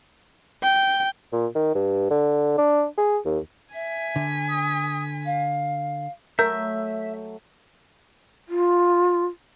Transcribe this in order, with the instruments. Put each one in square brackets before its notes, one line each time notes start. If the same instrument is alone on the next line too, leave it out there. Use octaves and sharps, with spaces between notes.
[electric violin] G5
[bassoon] A#2
D#3
G2
D3
D4
G#4
D#2
[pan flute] E5 [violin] G#5 B6
[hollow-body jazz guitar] D3
[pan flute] D#6
F5
[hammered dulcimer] F#3 A3 [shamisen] A#4 [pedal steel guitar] E5 [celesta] G6
[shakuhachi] F4